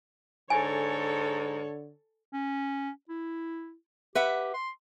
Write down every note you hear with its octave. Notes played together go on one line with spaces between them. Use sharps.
G#2 D3 A4 C#5 G#5
C#4
E4
G4 B4 E5 F#5
C6